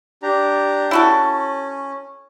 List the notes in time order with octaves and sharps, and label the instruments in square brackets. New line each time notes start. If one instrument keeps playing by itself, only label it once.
[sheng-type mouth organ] D4 G4 A#5
[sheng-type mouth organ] C#4 [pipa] E4 F#4 A4